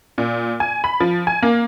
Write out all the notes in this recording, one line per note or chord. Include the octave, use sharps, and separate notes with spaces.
A#2
G#5
B5
F3
G#5
A#3